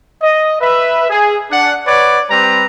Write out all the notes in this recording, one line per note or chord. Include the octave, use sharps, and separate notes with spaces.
D#5
B4 E5
G#4
D4 F#5
B4 C#5 D5 F#5
G3 C4 B4 A#5